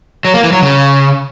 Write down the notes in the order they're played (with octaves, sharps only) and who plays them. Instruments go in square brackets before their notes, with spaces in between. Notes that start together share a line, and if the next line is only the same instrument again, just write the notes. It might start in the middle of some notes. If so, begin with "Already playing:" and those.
[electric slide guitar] F#3
A#3
E3
F#3
C#3